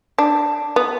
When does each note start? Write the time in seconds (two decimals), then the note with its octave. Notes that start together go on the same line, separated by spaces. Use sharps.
0.18 D4
0.76 B3